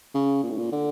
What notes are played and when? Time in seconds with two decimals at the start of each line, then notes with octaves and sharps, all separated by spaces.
0.14 C#3
0.43 A#2
0.51 A2
0.58 A#2
0.72 D3